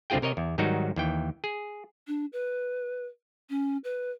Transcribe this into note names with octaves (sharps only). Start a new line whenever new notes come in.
C2 D3 C4 F4 G#4 G5
C3 A#4 C#5 D#5
E2
G#2 D#3 F#3 G3 D#4 F#4
D#2 E3 G5
G#4
D4
B4
C#4
B4